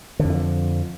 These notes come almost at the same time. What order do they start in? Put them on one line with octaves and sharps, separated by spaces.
D3 F2 E3 F3